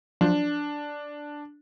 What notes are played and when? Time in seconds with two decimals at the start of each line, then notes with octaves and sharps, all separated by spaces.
0.21 F3 F#3 D4 C5